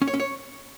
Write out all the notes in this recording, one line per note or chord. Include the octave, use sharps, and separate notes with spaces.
C#4
C#5
C#4
C#5